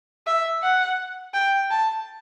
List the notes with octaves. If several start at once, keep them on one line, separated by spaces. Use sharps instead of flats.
E5
F#5
G5
A5